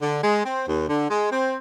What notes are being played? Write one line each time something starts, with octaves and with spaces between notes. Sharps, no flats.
D3
G#3
C4
D#2
D3
G#3
C4